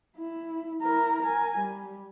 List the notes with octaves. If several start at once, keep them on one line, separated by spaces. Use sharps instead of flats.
E4
E4 A#4
A#4 G#5
G3